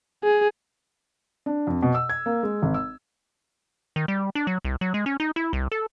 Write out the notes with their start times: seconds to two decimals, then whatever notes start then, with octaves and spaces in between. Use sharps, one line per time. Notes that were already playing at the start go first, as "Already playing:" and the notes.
0.24 G#4
1.46 D4
1.67 F2
1.83 B2
1.95 E6
2.09 G#6
2.26 A#3
2.43 G#3
2.63 G#1
2.74 E6
3.96 D#3
4.08 G3
4.35 D4
4.47 F#3
4.65 C2
4.81 F#3
4.94 G#3
5.06 C#4
5.20 D#4
5.36 E4
5.53 C2
5.72 A4